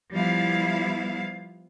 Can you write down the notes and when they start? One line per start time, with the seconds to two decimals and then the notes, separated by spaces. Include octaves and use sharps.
0.11 F3 G3 B3 E4 F5